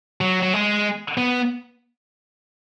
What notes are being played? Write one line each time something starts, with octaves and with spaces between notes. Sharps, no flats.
F#3
F#3
G#3
B3